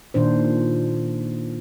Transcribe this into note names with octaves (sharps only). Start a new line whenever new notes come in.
A#2 D#3 D4 C5